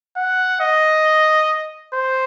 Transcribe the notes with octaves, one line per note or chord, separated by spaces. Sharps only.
F#5
D#5
C5